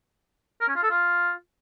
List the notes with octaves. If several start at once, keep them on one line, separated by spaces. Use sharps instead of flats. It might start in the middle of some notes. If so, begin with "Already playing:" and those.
A#4
C#4
F4
A4
F4